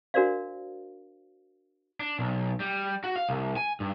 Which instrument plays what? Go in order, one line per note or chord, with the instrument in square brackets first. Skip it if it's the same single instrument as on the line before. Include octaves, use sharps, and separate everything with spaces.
[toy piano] D4 F#4 A#4 C5 D5 F5
[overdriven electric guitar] D4
B1
G3
F#4
F5
C2
G#5
G2